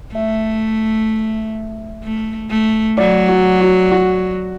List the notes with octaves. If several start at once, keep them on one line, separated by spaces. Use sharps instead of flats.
A3 E5
A3
A3
F#3 D5
F#4
F#4
F#4